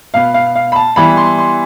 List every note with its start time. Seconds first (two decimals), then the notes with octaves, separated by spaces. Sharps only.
0.14 B2 B3 F5
0.34 F5
0.55 F5
0.72 B5
0.76 A5
0.96 E3 G3 B3 B5
1.17 C6
1.38 C6